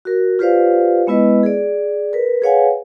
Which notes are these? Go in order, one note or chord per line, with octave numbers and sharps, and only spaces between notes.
F#4 A#4
F4 G4 B4 C5 D5 F5
G#3 B3 E4 B4 D#5
G#4 D5
A#4 B4
G#4 B4 C#5 F5 F#5 G#5